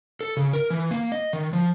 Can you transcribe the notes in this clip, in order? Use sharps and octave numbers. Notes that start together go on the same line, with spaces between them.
A4
C#3
A#4
E3
A#3
D#5
D#3
F3